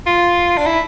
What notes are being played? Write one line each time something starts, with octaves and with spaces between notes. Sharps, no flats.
F4
D4
E4